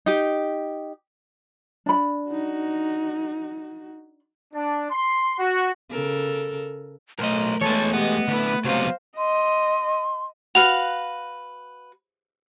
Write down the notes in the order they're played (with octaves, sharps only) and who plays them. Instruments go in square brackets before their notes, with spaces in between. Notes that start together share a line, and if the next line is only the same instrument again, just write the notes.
[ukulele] D#4 G4
D4 B5
[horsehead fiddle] D#4 F#4
[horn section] D4
C6
F#4
[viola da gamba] C#3 A4 A#4
[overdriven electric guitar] B1 D#5 [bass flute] A3 [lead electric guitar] A#4 C5
[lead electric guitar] E2 G#3 [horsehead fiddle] A4 A5 [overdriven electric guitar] B4 C#5
[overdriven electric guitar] B3 [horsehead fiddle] G4 D#5
[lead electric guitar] D3 E4 [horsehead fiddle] B4
[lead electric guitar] C#2 C3 [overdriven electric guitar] F#3 B3 [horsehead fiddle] C5 F5
[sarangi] D#5 [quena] C6
[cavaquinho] F#4 B4 F5 [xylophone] F7